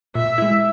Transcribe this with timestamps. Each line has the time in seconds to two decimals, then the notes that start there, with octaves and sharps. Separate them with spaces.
0.15 A#2 E5
0.38 G#3 E4